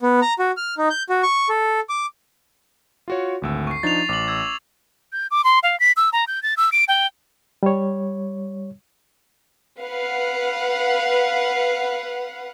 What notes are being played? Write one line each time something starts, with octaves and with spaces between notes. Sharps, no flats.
B3
A#5
F#4
F6
D#4
G6
F#4
C#6
A4
D6
F4 F#4 C#5
G#1 D2 E6
C#6 C7
F3 D4 D#4 A6 F7
A1 D6 F#7
E6 G#6
G6
D6
C6
F5
B6
E6
A#5
G6
A6
E6
D7
G5
G3 C#5
B4 F5 F#5